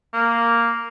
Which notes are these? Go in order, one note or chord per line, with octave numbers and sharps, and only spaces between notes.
A#3